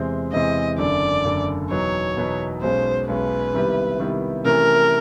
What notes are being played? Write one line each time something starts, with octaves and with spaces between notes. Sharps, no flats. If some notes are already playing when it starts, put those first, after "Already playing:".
Already playing: E2 C3 E3 G#3 C4
E2 C3 E3 G#3 C4 D#5
F#1 F#2 D3 D5
F#1 F#2 D3
E2 B2 F#3 B3 D#4 C#5
E2 B2 F#3 B3 D#4
B1 B2 G#3 C#4 C5
B1 B2 G#3 C#4 B4
C3 D#3 G3 B3 E4
C3 D#3 G3 B3 E4
C3 E3 A3 C#4 A#4